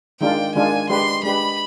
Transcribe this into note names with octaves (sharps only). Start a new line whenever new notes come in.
D#3 G#3 D4 F4 G5
D#3 G#3 D4 F4 G#5
G#3 D4 G4 B4 C6
G#3 D4 G4 B4 B5